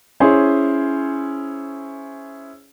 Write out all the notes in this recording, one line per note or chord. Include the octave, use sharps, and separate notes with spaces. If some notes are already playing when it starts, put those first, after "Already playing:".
C#4 E4 G#4 C5